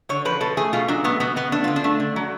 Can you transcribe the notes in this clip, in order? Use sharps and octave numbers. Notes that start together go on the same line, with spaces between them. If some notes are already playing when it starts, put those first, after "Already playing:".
D3 C#5
F3 B4
B2 A4
A3 G#4
B2 F4
F#3 D4
A3 B3
B2 B3
B2 B3
A3 D4
D3 F4
D4
A3
D3
F#3